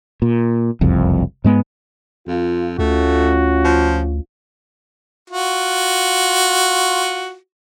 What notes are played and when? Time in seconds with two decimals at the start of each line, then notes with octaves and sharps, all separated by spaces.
0.22 A#2
0.81 F#1 C2 F2
1.44 G#2 G#3 B3
2.27 F2 F4
2.79 D2 A3 C#4 F4 F#4
3.64 F3
5.30 F4 F#4